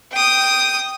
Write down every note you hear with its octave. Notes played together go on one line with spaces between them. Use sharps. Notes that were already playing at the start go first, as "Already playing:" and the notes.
G5 D#6